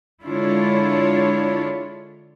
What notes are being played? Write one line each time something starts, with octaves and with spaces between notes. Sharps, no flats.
D3 G#3 D4 E4 F4 C#5